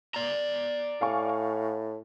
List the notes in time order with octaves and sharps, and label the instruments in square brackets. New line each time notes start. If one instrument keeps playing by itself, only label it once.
[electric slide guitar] D5 A#5
[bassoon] A2 [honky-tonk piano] F5 G#5 C#6